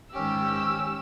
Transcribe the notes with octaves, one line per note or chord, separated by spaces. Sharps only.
G#2 D#3 C#4 G4 E6